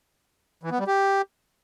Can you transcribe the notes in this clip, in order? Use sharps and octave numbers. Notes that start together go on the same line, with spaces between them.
E3
B3
G3
G4